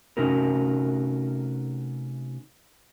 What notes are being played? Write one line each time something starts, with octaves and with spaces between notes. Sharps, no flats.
C3 A3 C#4 D#4 F#4 A#4